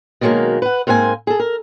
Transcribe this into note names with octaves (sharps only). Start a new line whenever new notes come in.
B2 D#3 F#3 G#3 A#3
B4 F#5
G#2 A#3 C4 B4 G#5
G#4 A4
A#4